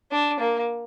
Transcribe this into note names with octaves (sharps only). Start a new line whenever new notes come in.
D4
A#3